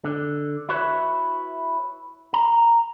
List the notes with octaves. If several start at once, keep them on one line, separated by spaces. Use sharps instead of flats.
D3
E4 F#4 B4 C#5 E5
A#5